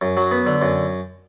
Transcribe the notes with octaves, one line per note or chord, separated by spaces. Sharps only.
F#2
F#3
B3
D3
F#2